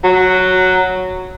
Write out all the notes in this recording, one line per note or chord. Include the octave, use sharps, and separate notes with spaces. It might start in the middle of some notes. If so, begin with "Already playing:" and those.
F#3